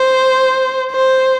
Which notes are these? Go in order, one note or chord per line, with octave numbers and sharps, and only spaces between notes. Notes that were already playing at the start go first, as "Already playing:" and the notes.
Already playing: C5
C5